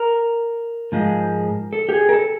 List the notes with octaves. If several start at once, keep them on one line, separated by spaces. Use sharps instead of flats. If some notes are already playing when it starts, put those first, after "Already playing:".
Already playing: A#4
G#2 F3 G#3
A4
G4
G#4
A#4
A4